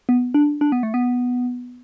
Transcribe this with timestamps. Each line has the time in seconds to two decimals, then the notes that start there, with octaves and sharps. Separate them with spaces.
0.09 B3
0.34 D4
0.61 D4
0.72 B3
0.83 A3
0.94 B3